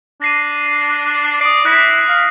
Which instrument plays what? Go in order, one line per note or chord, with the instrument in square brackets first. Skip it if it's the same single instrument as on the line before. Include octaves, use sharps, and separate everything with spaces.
[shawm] D4 [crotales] A#6 C7 D#7
[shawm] D5 [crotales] D#6 C7
[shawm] E4 [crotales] F#6 A#6 B6
[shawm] F5